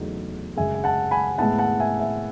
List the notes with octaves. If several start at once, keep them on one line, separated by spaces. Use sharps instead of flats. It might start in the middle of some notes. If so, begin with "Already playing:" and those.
Already playing: E2 C#3 F#3 A3 D#4
F#2 C#3 G#3 E5 G#5
G#5
F#5 A5
G#5 B5
A2 G#3 B3 E4 F#5 A5
F#5 A5
E5 G#5
E5